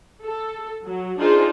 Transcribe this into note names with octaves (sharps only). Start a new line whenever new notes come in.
A4
F#3
D4 D#4 F4 G#4 C5